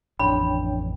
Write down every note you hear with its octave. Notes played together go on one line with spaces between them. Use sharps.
A1 F2 D4 C#5 G5 B5